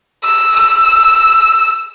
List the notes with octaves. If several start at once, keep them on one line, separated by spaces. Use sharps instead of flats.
E6
E6